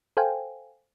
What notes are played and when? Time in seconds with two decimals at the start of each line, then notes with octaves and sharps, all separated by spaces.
0.17 A4 C5 F5 G5 G#5